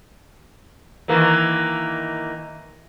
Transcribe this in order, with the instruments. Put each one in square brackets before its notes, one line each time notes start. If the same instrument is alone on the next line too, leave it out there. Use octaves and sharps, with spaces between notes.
[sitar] D#3 E3 A#3